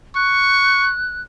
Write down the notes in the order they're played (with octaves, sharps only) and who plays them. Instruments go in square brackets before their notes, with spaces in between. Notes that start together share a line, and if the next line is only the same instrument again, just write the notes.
[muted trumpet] C#6 [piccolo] F#6